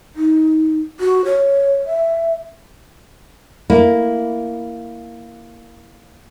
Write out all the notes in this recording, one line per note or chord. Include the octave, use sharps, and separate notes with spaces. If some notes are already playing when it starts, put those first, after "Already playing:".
D#4
F#4
C#5
E5
A#3 E4